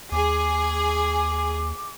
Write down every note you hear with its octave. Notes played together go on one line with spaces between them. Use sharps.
D#2 G#4 D6